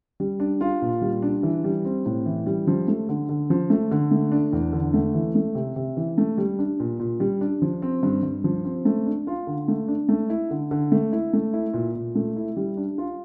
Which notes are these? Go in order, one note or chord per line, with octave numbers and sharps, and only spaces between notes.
G3
D4
F4
A#2
G3
D4
E3
G3
C4
A2
E3
G3
F3
A3
D3
D3
F3
A3
D3
A3
D4
E2
D3
A3
E3
A3
C3
C3
E3
A3
G3
D4
A#2
A#2
G3
D4
F3
C4
G2
G2
F3
C4
A3
D4
F4
D3
A3
D4
A3
E4
D3
D3
A3
E4
A3
E4
A#2
A#2
A3
E4
G3
D4
F4